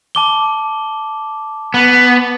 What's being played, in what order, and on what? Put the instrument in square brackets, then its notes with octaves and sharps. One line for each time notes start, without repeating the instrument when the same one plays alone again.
[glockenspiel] A5 D6 G7
[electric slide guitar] B3